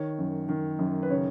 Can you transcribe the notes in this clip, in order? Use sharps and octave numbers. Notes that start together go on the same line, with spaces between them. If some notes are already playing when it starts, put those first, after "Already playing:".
Already playing: D#3 C#5
F#2
D#3
F#2
B4
C#3 C#5